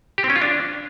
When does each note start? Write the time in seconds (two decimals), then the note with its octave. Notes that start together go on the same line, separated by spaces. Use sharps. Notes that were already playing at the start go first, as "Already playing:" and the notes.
0.18 G4
0.24 C4
0.30 C#4
0.36 F4
0.42 D4